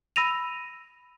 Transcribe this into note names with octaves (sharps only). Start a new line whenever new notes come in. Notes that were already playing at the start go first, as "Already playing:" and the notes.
B5 E6 A#6 D#7 F7